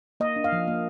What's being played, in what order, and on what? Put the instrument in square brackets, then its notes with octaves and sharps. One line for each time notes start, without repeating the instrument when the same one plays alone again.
[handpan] A#3 D#5
D4
F5
F3
A#3